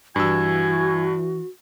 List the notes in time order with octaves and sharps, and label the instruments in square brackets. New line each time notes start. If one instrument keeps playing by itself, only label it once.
[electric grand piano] G2 E6 [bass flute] E3 [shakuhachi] F#4 [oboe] G#5